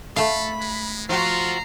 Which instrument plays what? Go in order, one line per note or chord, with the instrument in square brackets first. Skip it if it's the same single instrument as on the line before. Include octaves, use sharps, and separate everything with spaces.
[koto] A3 F5 [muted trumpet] A4 [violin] B5
[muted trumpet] G#3
[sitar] F3 F4 F#4 [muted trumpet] A4 [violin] A#5 C7